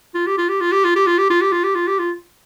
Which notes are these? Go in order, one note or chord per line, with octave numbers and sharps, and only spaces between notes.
F4
G4
F4
G4
F4
G4
F4
G4
F4
G4
F4
G4
F4
G4
F4
G4
F4